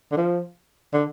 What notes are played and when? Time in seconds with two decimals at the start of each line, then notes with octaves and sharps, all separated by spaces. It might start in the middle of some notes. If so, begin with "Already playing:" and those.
0.12 D3
0.17 F3
0.93 D3